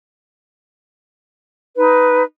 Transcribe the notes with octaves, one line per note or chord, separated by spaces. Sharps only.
D#4 B4